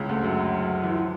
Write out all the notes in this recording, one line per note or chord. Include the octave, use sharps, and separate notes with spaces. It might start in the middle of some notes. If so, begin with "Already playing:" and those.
Already playing: C#2 C#3
D2 D3
F#2 F#3
E3
F3